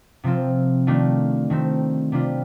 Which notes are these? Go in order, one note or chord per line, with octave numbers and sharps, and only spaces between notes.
C3 F3 C4 F4
D#3 A3 D4 F4
D#3 A3 C4
C3 G3 D4 F4